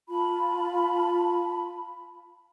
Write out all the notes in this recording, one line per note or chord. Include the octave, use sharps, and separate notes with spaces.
F4 A5 B5